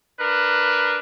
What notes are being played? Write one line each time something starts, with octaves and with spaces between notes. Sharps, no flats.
D4 A#4 B4